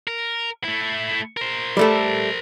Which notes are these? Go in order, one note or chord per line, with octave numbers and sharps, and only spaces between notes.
A#4
A3 E4
A#4 C5
G3 A3 A4